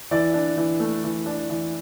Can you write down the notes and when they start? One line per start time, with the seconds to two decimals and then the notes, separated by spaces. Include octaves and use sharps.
0.11 E3 D5
0.34 D4
0.57 E3
0.80 A3
1.04 E3
1.26 D4
1.50 E3